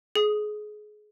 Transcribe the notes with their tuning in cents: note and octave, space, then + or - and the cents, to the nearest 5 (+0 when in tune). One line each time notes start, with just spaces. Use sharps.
G#4 +25 D#6 +0